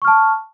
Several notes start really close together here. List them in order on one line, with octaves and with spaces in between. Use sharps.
C#6 F6 A5